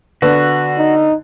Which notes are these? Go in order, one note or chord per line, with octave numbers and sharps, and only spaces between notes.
D3 B3 F#4
D#4